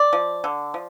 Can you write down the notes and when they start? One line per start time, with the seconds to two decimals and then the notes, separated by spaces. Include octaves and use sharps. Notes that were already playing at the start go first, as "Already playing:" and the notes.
Already playing: D5
0.13 F3
0.44 D3
0.74 F3